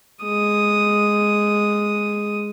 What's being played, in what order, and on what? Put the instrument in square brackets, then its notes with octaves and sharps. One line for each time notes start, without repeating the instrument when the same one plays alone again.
[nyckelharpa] G#3 D#6